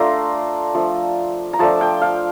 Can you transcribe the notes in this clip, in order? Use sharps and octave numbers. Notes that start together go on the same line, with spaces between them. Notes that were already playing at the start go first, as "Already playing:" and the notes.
Already playing: A3 D4 F4 A#5 C6
F3 A3 D4
A#5
F3 A3 D4 A5
G5
F5